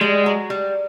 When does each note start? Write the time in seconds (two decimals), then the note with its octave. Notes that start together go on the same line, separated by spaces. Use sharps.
0.01 G3 G#3
0.26 F#3
0.50 G3